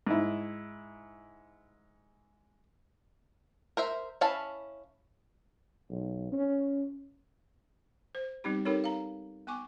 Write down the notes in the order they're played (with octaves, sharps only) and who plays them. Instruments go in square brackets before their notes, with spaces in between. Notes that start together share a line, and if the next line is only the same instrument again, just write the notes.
[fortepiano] G#2 E4
[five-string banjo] A#4 C5 E5
C#4 E4 F5 A5 B5
[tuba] B1
C#4
[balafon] C5
G3 B3 C4 D#4 G4
C4 D#4 G4 A4 A#4 C#5
F5 A#5
B3 G#5 C#6 D6